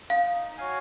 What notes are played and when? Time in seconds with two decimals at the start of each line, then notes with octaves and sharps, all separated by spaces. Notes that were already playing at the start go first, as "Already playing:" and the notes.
0.10 D#4 F5
0.57 F#4 C#5 F5 G#5